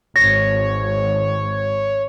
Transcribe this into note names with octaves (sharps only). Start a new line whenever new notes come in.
G#1 C#5 A#6